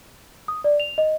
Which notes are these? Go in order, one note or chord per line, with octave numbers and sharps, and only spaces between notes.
D#6
D5
F7
D#5